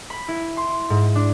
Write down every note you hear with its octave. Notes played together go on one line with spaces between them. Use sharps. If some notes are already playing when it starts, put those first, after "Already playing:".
B5
E4
C6
G#2
D4